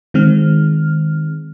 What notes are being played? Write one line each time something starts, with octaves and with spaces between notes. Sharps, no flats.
D#3 G#3 C4 F6